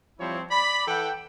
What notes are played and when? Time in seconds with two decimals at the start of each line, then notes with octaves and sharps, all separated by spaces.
0.19 F3 G3 C4 E4 C#5
0.51 D5 B5
0.87 E3 A4 F#5 G5